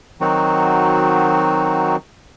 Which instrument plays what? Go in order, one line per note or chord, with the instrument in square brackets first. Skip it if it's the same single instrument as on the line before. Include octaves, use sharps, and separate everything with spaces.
[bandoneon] D#3 F#3 C4 D#4 F#4